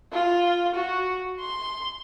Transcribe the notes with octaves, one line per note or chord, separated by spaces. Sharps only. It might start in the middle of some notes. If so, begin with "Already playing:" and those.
F4
F#4
C6